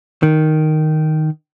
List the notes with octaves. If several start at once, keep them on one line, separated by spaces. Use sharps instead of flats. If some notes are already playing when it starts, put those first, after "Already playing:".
D#3